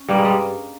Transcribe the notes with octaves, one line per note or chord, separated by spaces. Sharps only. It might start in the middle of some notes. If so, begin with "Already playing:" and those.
Already playing: C#4
G2 G3 A#3
G#3
G3